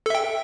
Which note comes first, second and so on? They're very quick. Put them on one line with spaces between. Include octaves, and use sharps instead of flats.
A4 E5 G5